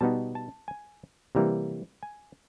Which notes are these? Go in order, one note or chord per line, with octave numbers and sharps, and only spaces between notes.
B2 G3 B3 D#4 A5
A5
G#5
C3 E3 G3 A#3 A#5
G#5